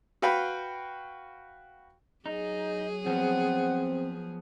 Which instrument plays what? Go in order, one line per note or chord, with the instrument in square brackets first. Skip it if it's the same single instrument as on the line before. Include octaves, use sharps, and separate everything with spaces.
[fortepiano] F#4 B4 F5 G5 B5
[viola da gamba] F#3 G#4 [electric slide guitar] D#4
[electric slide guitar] F3 B3 [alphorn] C4 [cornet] F#5